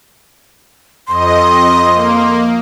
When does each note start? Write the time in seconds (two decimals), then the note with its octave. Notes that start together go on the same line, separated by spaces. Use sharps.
1.08 F2 D#5 C6
1.94 A#3